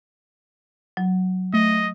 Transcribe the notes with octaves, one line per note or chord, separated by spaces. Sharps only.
F#3
A3 D#5